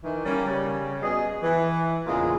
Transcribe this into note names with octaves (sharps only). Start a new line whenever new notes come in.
D#3 E3
G3 A#3 C#4
C#3 G3 C#4
B2 G#4 D#5
E3
E2 A#2 C#3 G#3 F4 G#4